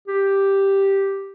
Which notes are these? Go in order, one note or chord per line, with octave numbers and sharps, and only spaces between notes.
G4